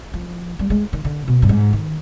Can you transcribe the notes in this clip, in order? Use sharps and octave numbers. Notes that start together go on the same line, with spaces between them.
F3
G3
G#3
D#3
D3
B2
G2
G#2
D#3